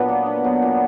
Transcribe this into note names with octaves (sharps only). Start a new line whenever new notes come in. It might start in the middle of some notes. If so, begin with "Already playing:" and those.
Already playing: A#2 F#3 B3 D4
A#3
D4
F#3
A#2